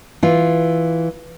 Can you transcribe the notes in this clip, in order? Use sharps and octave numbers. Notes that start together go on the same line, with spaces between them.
E3 F4